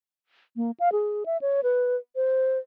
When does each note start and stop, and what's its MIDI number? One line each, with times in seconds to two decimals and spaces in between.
0.56 0.71 58
0.80 0.92 77
0.92 1.24 68
1.26 1.37 76
1.41 1.61 73
1.63 1.96 71
2.16 2.58 72